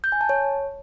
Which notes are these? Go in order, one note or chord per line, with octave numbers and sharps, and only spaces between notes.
G6
G#5
A5
C#5